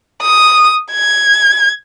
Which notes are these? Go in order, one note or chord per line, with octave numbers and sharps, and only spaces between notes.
D#6
G#6